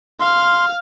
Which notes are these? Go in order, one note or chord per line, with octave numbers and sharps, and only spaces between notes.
F5 C6 F6